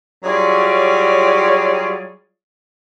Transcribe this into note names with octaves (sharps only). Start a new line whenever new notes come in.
F#3 G3 F4 G#4 C#5 D5